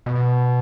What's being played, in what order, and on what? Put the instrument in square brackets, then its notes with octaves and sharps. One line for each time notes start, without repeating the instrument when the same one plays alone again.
[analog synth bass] B2